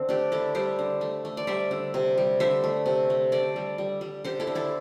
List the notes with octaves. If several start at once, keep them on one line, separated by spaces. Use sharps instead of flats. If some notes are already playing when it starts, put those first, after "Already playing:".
Already playing: D3 C4
A3 D4 G4
D3 E4 A4
G3 G4 C5
D3
A3
A3
D5
G3 C5 E5
D3
C3
G3
D3 C5 E5
A3
C3
A3
D3 A4 D5
G3
G3
G3
D3 G4 C5
E4 A4
D3
E4 A4